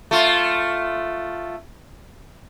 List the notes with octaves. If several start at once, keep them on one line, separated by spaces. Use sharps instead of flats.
A3 F4